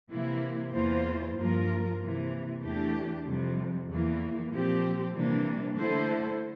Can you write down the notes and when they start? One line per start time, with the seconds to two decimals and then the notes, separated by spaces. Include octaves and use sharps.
0.10 C3 E3 A#3 E4
0.73 E2 E3 A#3 F4 C5
1.36 G2 F3 A#3 F4 A#4
1.99 C3 E3 A#3
2.62 E2 E3 A3 D4 G4
3.25 F2 C3 G3
3.88 E2 E3 A#3
4.51 A#2 F3 C4 G4
5.14 C3 E3 G3 A#3 D4
5.76 D3 A3 E4 A4 C5